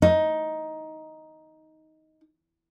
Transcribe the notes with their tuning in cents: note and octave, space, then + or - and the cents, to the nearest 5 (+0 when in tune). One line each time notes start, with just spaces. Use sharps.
D#4 +10